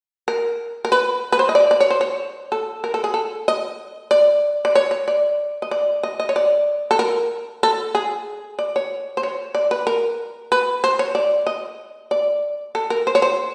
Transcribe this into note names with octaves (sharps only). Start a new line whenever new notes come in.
A#4
A#4
B4
B4
C5
D#5
D5
D5
C#5
C5
C#5
A4
A#4
A4
G#4
A4
D#5
D5
D5
C#5
C#5
D5
D#5
D5
D#5
D#5
C#5
D5
A4
A#4
A4
G#4
D5
C#5
C5
C#5
D5
B4
A#4
B4
C5
C#5
D5
D#5
D5
A4
A#4
C5
C#5
C5